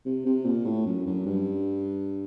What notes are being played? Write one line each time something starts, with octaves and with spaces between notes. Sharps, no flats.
C3
C3
A#2
A2
F#2
F#2
G2